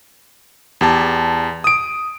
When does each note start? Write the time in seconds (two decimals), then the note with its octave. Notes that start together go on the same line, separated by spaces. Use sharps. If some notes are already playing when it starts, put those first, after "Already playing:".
0.81 E2 G4 A5
1.64 D#6 D7